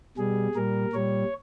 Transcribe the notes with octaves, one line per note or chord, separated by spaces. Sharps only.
B2 G3 G#4
A#2 G3 A#4
A#2 G3 C#5